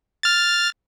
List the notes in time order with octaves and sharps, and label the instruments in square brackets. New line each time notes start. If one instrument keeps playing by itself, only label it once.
[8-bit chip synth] F6 A6